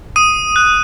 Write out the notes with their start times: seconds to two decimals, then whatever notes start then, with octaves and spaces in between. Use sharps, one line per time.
0.16 D#6 D#7
0.56 F#6